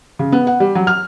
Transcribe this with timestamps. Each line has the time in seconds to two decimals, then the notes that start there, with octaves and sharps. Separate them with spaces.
0.19 C#3
0.32 B3
0.47 F#5
0.60 G3
0.75 F#3
0.87 F6